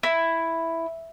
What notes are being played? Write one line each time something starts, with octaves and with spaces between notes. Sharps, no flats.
E4